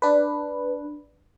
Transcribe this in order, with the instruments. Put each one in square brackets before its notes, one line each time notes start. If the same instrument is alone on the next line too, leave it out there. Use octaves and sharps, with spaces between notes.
[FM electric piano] D4 B4